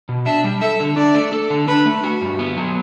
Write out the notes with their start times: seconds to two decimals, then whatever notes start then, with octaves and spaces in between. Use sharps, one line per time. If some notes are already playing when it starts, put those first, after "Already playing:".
0.09 B2
0.26 D4 E5
0.44 G3
0.61 A4 E5
0.80 D3
0.97 D4 D5
1.14 A3
1.33 A4
1.50 D3
1.68 D4 B4
1.86 A3
2.04 F#4
2.21 G2
2.39 B3
2.57 F#3